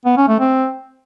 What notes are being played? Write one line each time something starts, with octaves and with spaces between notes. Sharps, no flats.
B3
C#4
A3
C4